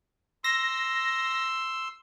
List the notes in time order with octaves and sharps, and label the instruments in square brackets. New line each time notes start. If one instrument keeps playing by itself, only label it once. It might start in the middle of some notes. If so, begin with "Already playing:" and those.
[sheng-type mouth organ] C6 E6 [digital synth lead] A#6